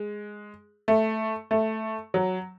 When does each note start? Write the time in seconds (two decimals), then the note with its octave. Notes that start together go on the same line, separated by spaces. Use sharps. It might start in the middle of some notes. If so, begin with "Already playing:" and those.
Already playing: G#3
0.88 A3
1.51 A3
2.14 F#3